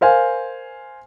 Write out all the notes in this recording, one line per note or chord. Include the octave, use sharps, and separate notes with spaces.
A#4 C5 F5 G#5